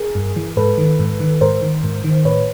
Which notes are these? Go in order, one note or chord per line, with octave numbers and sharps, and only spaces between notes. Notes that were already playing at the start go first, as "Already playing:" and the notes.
Already playing: G#4 A#4
G2
E3
G#2 A4 B4
D#3
G#2
D#3
G#2 A#4 C5
D#3
G#2
D#3
A2 B4 C#5